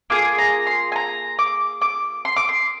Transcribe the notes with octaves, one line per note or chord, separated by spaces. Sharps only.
A#3 F4 G#4 D6
A#5
C6
G#5
A#5
D6
D6
C6
D6
C6